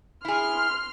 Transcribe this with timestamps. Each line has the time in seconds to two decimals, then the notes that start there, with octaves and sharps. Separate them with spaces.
0.25 E4 G#4 C6 F6